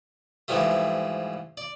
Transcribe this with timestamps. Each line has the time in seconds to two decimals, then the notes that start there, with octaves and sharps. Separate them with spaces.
0.48 G#2 E3 F3 G3 A3
1.57 D5